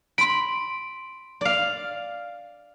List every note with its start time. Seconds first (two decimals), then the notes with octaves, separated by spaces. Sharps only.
0.18 B5 C6 D7
1.41 D5 F5